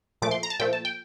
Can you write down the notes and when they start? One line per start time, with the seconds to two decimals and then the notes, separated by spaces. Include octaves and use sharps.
0.22 A#2 F3 A3 D6
0.31 C6
0.43 A#5
0.50 A5
0.59 A#2 F3 A3 G5
0.73 A5
0.85 G5